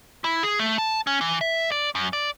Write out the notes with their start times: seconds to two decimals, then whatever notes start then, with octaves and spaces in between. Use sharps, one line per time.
0.24 E4
0.43 G#4
0.59 A3
0.78 A5
1.07 C#4
1.21 E3
1.41 E5
1.72 D5
1.95 F#2
2.13 D5